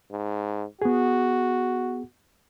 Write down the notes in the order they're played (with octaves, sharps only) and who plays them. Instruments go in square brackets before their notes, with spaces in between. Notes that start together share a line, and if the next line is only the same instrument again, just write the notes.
[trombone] G#2
[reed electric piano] B3 G#4 [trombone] F#4